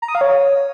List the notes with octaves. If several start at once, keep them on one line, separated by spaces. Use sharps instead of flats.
A#5
D#6
F5
C#5